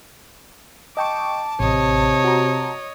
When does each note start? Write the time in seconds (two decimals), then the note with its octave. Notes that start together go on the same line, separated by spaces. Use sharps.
0.97 D#5 G5 A5 C#6 D6
1.60 A1 C3 C#5 D#5
2.24 F#4 A#5